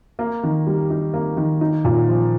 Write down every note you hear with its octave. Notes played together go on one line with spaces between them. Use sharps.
A#3
D#3
G3
D#4
A#3
D#3
D#4
A#2
F3